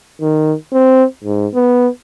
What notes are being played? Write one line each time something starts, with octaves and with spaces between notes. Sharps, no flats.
D#3
C4
G#2
B3